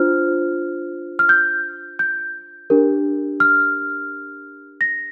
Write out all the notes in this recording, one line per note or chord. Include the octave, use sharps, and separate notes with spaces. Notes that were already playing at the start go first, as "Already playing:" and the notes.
Already playing: D4 F4 C5 F6
F6
G6
G6
D4 G4 A#4
F6
A#6